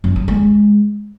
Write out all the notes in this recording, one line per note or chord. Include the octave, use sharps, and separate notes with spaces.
F#2
F#3
G#3